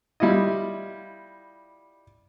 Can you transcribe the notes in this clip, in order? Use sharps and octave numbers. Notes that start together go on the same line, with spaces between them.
G3 E4 F4 D#5